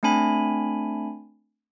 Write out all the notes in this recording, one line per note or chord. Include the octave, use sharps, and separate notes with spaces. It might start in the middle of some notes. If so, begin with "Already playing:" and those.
A3 C4 D4 G#5 B5